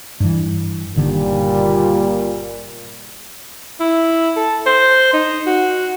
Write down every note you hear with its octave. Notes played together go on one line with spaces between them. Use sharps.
G2 E3
G1 A#2 D3 D#3 G3
E4
A4
C5
D#4
F#4